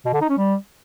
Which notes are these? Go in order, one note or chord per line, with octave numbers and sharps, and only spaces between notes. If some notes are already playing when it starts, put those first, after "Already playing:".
B2
D3
D#4
C#4
G3